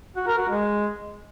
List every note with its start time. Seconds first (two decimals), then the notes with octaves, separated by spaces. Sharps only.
0.16 F#4
0.27 A#4
0.38 F#4
0.49 G#3